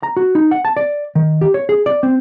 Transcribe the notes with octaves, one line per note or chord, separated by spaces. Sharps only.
A#5
F#4
D#4
F#5
A5
D5
D#3
G4
C#5
G#4
D5
C4